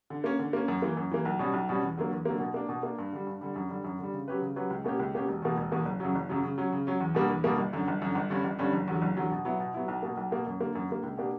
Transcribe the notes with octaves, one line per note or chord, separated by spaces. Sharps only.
D3
A#3 C#4
D3
A#3 C#4
F#2
E3 A#3
F#2
E3 A#3
B1
B2 G3 C#4
B1
B2 G3 C#4
E2
D3 F#3 A#3
E2
D3 F#3 A#3
B2
A#3 D4
B2
A#3 D4
G2
D3 G3
G2
D3 G3
F#2
D3 G3
F#2
D3 G3
C#3
F#3 C#4 G4 B4
C#3
F#3 C#4 G4 B4
C#2
B2 A#3 C#4 G4
C#2
B2 A#3 C#4 G4
E1
E2 B2 A#3
E1
E2 B2 A#3
F#1
F#2 C#3 F#3
F#1
F#2 C#3 F#3
C#3
F#3 C#4
C#3
F#3 C#4
E2
B2 G3 A#3 D4
E2
B2 G3 A#3 D4
G1
F#2 D3
G1
F#2 D3
G1
G2 D3 G3 C#4
G1
G2 D3 G3 C#4
F#1
E2 D3 F#3
F#1
E2 D3 F#3
B2
F#3 B3 E4
B2
F#3 B3 E4
B1
B2 A#3
B1
B2 A#3
F#2
D3 A#3
F#2
D3 A#3
C#2
B2 A#3 D4 G4